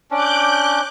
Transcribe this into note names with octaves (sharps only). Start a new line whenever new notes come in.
C#4 D4 D6 F#6 G6